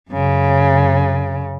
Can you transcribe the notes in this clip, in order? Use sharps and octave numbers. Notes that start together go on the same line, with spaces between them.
F#2 C#3